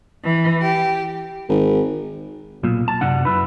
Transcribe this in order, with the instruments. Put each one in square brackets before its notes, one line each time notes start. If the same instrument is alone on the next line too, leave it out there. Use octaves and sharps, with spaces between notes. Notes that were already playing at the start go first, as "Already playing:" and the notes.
[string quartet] E3
G4
[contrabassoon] G#1
[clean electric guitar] B1 A#2
A5
F#2 C3 D4 F#5
F#2 E4 B4